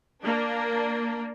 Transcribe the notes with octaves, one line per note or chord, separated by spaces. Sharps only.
A#3 D4